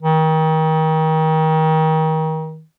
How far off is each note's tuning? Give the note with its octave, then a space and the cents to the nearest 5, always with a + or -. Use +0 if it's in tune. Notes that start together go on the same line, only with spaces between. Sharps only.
D#3 +30